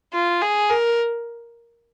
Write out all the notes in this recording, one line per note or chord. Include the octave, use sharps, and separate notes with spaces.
F4
G#4
A#4